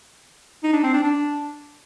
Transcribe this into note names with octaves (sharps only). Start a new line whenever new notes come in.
D#4
D4
C4
D4
D4